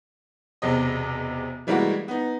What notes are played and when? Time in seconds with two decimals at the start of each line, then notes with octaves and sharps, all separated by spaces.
0.62 E1 E2 C3 D#5
1.67 E3 G3 G#3 A#3 E4 F#4
2.08 B3 D#4